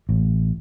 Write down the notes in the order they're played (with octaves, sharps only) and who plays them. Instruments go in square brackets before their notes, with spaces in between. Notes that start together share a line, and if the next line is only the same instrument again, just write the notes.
[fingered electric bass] A1